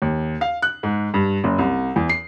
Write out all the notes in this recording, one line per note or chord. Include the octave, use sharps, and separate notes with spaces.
D#2
F5
F#6
G#2
G2
F#1
C2
E2
C7